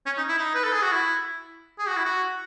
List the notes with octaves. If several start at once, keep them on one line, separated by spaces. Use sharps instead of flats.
C#4
D#4
E4
D#4
B4
A4
G#4
F#4
E4
G#4
F#4
E4
F#4